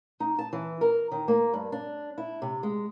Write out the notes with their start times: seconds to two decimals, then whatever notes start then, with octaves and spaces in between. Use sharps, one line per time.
0.20 D#4
0.39 A5
0.53 E3
0.81 A#4
1.12 D#3
1.28 A#3
1.53 G2
1.72 D4
2.18 E4
2.42 C3
2.63 G#3